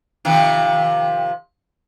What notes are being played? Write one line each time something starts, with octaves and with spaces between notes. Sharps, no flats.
C3 D#3 F3